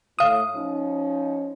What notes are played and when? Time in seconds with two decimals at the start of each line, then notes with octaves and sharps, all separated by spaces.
0.19 A2 F5 D#6
0.55 F3 C#4 D#4